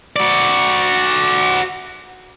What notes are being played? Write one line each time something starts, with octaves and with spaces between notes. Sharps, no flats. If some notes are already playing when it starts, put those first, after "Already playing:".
F#4 D5